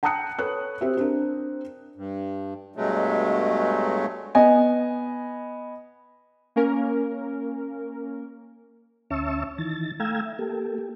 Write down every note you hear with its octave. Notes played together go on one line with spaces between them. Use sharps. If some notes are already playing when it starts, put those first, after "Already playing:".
G5 A5 A#5 D#6 F#6 C#7
A4 B4 C#5 F#6
C4 G4 E5
C4 D4 A#4
G2
G2 B2 F#3 G#3 A3
B3 D#5 G#5
A#3 C#4 A#4
D2 C#4 E5 A5 C#6 E6
D#3 E3 A6
A3 F5 G5 A#5 E6 G#6
E5
A#3 G4 A4
G4